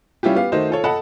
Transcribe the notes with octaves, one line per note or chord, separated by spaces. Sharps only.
G3 C#4 E4 F4 G4
B3 G4 F5
D#3 A3 D#4 F#4 C5
F4 A4 C#5
A4 D#5 F#5 A5 B5